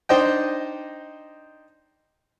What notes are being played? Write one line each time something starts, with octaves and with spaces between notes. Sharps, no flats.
D4 D#4 C5 D#5 G5